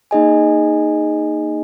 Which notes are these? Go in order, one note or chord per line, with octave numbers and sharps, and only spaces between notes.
A#3 D#4 G#4 D#5 G#5